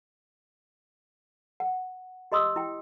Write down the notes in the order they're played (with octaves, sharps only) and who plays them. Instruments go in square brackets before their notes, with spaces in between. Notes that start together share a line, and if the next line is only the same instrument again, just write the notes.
[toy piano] F#5
G4 D#5 C6 D#6 E6
E4 G5